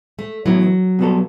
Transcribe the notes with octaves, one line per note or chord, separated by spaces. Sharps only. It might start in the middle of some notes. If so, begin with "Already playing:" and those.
A3
A2 E3 F#3 B3 E4
B2 G3 B3 F#4 A4